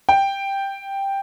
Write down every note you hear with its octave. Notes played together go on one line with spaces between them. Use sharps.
G5